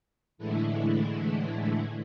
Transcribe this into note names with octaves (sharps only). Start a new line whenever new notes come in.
A2 D3 E3 G#3 A3 E4